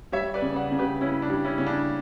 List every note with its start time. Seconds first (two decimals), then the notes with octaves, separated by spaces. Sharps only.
0.12 G3 C#5 E5
0.34 B4 D5
0.42 C#3
0.56 D5 F#5
0.71 C#3
0.79 G4 B4
1.01 C#3 C#4 E4
1.22 D4
1.29 G3
1.44 C#4 E4
1.58 C#3 C#4
1.66 D4